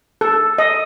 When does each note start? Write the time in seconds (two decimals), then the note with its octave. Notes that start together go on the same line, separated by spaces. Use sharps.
0.21 A4
0.58 D#5